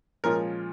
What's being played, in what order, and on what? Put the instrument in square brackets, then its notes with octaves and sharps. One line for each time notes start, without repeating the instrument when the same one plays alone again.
[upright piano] A#2 F3 G#3 C#4 F4 A#4